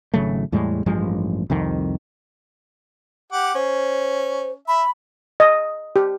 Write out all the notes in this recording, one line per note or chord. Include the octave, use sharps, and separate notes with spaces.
G#1 C#3 F#3 A3
E2 A2 G3 G#3
A1 G2 F3 G#3
C2 F2 D#3
G4 F#5 D6
C#4 C5
E5 B5
D#5
G4